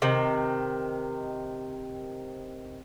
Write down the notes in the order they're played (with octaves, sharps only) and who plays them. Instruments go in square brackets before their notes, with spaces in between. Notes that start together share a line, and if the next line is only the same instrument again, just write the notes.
[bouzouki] C3 D#3